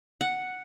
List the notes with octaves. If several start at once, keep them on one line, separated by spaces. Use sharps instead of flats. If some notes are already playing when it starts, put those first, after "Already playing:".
F#5